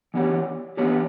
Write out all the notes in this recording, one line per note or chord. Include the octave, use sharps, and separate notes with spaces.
E3 B3 D4 G4 C#5
E3 B3 D4 G4 C#5